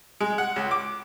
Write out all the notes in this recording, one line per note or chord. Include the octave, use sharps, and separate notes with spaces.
G#3
F#5
C#2
D6